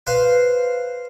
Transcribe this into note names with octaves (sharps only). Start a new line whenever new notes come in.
B4 C5 F5